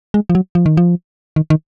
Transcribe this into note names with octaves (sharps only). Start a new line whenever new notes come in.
G#3
F3
F#3
F3
D#3
F3
D#3
D#3